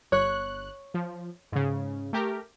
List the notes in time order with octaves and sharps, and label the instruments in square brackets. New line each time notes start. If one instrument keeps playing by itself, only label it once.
[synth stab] G1 F#6 [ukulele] C#5
[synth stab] F3
G#2 C#3
A3 G4 A#4